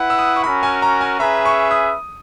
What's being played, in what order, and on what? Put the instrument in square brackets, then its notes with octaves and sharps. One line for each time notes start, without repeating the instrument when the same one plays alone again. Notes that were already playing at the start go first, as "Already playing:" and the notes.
Already playing: [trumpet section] E4 B4 F#5
[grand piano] E6
D#6
C#6
[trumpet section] C#4 F#4 A#4 [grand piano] B5
[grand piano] G#5
A#5
G#5
[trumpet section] C#4 G#4 B4 E5 [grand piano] A#5
[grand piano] C#6
D#6